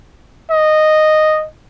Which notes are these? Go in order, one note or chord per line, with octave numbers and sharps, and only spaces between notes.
D#5